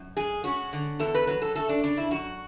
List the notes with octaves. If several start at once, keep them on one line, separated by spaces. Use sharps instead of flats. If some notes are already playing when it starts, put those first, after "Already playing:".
Already playing: F#2
G#3 G#4
C#4 F#4
D3
E2 A4
B4
F#3 B4
A4
A3 A4
D4
C#3 D4
E4
F#2 F#4